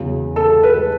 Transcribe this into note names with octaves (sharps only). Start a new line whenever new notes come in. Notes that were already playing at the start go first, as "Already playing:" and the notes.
Already playing: E2 C#3 F#3
A4
B4